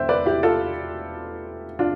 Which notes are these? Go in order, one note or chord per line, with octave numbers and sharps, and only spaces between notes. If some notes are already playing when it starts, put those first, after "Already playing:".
Already playing: E1 E2 D3 C5 E5 G5
B4 D5
E4 G4
F4 A4
D4 F4